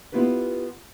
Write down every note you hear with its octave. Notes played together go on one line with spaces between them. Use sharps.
B3 E4 F4 G4 B4